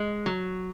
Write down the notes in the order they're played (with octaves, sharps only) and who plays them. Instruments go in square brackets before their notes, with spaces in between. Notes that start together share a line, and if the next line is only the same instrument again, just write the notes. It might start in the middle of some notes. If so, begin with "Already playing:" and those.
Already playing: [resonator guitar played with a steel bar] G#3
F#3